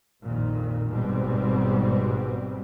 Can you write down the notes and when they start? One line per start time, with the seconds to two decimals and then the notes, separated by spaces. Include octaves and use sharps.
0.25 A#1 F2 A#2 D#3
0.91 G#1 G#2 B2 G3 B3 C4